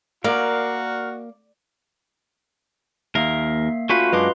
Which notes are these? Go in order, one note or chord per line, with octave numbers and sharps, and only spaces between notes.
A#3 F#4 A#4 D5 F5
D#2 A#3 A#4 E5 C7
A3 C#4 F4 F#4 B4 F5
F#2 G#3 D4 B4 D#5 C6